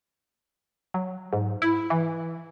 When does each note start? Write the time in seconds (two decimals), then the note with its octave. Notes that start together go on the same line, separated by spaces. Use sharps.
0.94 F#3
1.33 G#2
1.62 E4
1.90 E3